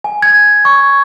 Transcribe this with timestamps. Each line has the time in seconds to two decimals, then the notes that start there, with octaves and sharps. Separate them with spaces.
0.04 G#5
0.22 G#6
0.65 C#6